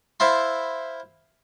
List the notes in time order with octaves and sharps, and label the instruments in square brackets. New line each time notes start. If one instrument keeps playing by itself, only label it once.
[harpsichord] E4 C5 E5 F5 A5 C6